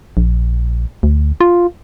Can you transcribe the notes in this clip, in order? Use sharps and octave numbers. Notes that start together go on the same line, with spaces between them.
A#1
D2
F4